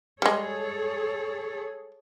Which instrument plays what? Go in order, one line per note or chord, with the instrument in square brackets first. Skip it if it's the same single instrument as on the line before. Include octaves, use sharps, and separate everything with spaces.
[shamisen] G3 G#3 [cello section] G#4 A4 C#5